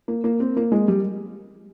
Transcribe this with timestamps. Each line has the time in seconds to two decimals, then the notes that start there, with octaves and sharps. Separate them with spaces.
0.08 A#3
0.24 A#3
0.40 C4
0.57 A#3
0.72 G#3
0.88 G3